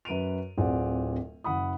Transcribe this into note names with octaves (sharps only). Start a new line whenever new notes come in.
F#2 B4 D7 D#7 F7
D1 C4 F4 G#4 D5 F#5
F#1 F#5 B5 D#6